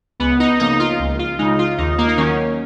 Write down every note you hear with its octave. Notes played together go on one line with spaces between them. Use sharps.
C#2 B3
D#4
C#3 F3 A#3 D#4
F4
C#2
F4
C#3 G#3 D#4
F4
D#2 D#4
A#3
D#4
D#3 F#3 C#4